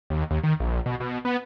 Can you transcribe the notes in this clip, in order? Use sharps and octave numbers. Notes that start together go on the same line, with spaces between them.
D#2
D#2
D#3
A#1
B2
B2
B3